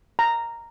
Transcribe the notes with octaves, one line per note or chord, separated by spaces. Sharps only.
A#5